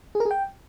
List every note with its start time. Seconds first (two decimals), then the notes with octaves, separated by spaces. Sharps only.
0.15 G#4
0.20 A#4
0.25 G#4
0.31 G5